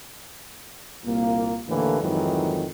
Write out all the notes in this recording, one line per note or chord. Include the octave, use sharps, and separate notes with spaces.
C2 A#2 A#3
D#2 A2 D3 E3 A#3
F2 G#2 D#3 E3 F#3